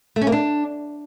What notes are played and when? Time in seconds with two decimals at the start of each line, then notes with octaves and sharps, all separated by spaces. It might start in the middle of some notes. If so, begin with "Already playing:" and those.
0.16 A3
0.21 C#4
0.27 A#3
0.32 D4